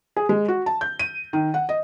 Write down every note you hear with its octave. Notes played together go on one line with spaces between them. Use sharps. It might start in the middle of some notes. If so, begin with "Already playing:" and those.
G#4
G#3
F#4
A5
G6
D#7
D#3
F#5
D#5